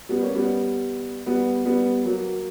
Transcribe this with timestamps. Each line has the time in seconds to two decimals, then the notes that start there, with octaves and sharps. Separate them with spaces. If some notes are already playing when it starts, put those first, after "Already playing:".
0.09 G3 B3
0.22 A#3 C#4
0.35 G3 B3
1.26 G3 B3
1.65 G3 B3
2.05 F#3 A#3